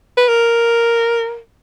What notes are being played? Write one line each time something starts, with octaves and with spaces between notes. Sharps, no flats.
B4
A#4